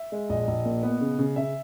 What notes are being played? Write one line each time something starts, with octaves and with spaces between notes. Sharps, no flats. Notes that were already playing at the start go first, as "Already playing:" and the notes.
Already playing: E5
G#3
A#1 D#5
A#1
A#2
B3
C#3
C#3
C#3 E5